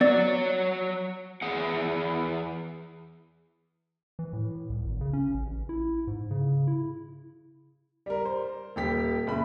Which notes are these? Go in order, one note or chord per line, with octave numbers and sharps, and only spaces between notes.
F#3 B3 C#5 D5
E2 G#4 F#5
E3
A2
C2
G#1
C#3
C#4
A1
E4
G#2
C#3
E4
G3 A#4
C5
D#1 G4 B6
F#1 B5